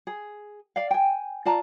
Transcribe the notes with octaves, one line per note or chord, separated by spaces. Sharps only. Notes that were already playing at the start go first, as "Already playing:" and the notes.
G#4
D5 F5
G5 G#5
F4 D5 A5 A#5